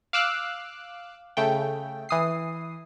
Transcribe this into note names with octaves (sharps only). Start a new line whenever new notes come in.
F5 D6 E6 F#6
C#3 A3 G5
E3 D#6 C7